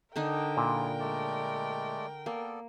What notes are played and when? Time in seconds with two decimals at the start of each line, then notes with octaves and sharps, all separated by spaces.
0.16 D3 D4 D#4 A#4 G5
0.57 A#2 E4 F4 G#4
1.00 G#3 A3 D5
2.26 A#3 B3 A4 D5